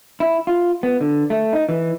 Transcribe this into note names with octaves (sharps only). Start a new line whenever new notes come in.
E4
F4
B3
D3
A3
D#4
E3